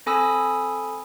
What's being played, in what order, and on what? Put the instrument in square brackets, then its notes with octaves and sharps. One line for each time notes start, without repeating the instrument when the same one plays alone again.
[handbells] C4 A4 G#5 B5 D#6 E6